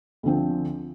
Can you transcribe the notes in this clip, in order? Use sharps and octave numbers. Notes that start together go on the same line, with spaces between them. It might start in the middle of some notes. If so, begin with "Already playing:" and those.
D2 D3 F3 C4